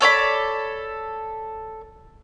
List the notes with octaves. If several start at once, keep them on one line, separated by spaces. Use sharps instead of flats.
A4 C#5 D5 B5